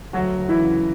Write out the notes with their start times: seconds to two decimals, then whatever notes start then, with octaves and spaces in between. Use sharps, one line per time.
0.13 D2 F#3 F#4
0.37 D2
0.49 E3 E4
0.60 C#3